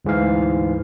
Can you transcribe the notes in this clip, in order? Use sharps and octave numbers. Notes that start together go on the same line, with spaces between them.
D2 G#2 E3 F5